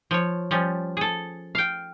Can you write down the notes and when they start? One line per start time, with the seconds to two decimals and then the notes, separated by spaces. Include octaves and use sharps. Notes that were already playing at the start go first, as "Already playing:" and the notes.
0.11 F3 C#5
0.51 F3 G3 C#4
0.97 G#4 A4
1.55 F5 G5